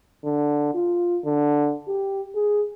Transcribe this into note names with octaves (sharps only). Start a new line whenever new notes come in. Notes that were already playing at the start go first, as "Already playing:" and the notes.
D3
F4
D3
G4
G#4